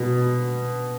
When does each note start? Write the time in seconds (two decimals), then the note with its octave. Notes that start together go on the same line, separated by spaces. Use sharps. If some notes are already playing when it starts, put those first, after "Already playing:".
Already playing: B2